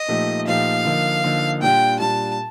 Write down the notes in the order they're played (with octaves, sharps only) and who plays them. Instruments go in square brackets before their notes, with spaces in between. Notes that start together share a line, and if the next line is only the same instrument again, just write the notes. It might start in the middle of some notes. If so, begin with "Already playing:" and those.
Already playing: [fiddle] D#5
[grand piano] A#2 F3 A3 D#4 G4
[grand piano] A#2 F3 A3 D#4 G4 [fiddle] F5
[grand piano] D3 F3 A#3 D#4
D3 F3 A#3 D#4
[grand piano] A#2 G3 D4 F4 [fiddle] G5
[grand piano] A#2 G3 D4 F4 [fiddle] A5